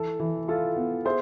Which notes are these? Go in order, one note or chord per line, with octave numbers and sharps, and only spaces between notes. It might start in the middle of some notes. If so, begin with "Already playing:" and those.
Already playing: E3 A4
E3
E4 F4 A4
B3
G#4 C5 E5